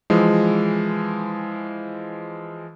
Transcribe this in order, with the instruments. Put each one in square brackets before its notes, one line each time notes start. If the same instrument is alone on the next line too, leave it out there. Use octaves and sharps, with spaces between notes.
[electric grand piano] E3 F3 G#3